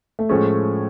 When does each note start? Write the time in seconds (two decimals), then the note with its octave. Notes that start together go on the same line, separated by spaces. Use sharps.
0.19 A3
0.29 A2 F3 G#3 A3 C#4